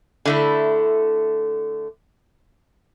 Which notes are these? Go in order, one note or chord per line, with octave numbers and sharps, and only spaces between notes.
D3 A3 E4